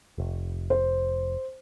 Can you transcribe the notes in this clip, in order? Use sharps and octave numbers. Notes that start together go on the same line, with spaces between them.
F1
C5